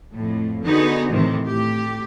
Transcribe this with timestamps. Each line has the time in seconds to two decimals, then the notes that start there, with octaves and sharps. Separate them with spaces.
0.14 F2 A2
0.63 D3 B3 D#4 F#4 G#4
1.11 A2 C3 D#3 E3
1.46 A2 G4